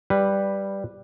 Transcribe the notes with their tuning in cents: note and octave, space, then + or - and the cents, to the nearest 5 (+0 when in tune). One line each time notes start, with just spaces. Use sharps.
G3 +0 B4 +0